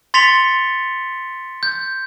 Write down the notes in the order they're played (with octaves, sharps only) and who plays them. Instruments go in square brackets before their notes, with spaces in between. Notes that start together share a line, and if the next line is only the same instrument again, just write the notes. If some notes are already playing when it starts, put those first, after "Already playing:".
[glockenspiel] C6 A6 B6 C#7 F7 G7
G6